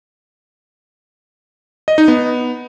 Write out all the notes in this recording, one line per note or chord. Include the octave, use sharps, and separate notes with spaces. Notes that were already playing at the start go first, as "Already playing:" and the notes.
D#5
D#4
B3